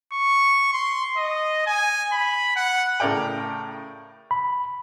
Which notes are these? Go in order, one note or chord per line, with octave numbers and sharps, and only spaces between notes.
C#6
C6
D#5
G#5
B5
F#5
A2 C#3 A#4 D5 G5
B5